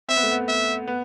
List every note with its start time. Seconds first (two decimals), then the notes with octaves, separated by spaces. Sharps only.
0.09 C4 E5
0.16 B3
0.23 A3
0.31 B3
0.48 E5
0.87 B3